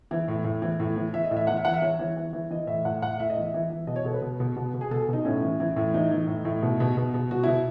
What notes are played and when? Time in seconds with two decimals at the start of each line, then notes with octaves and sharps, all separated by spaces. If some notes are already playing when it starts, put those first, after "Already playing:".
0.11 E3
0.28 A2
0.44 A2
0.62 E3
0.80 A2
0.96 E3
1.14 E3 E5
1.24 D#5
1.31 A2
1.37 E5
1.47 E3 F#5
1.57 E5
1.65 E3 F#5
1.74 E5
1.82 E3 C#5
1.99 E3
2.17 E3
2.33 E3
2.51 E3 D#5
2.67 A2 E5
2.85 A2 F#5
3.02 A2 F#5
3.20 A2 E5
3.30 D#5
3.37 E3 E5
3.54 E3
3.70 E3
3.87 B2 D#5
3.96 C#5
4.05 B2 A4
4.14 B4
4.22 B2
4.40 B2
4.56 B2
4.74 B2
4.81 G#4
4.91 B2 A4
5.08 B2 D#4
5.25 A2 C#4
5.42 E3
5.60 E3
5.76 A2
5.94 E3 D#4
6.11 E3
6.27 A2
6.45 A2
6.62 B2
6.80 B2
6.97 B2
7.14 B2
7.31 B2 F#4
7.43 B2 E4